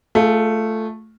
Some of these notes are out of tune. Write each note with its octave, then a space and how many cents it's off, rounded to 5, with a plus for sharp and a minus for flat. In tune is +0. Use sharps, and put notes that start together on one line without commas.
A3 +0 F4 +0 G#4 +30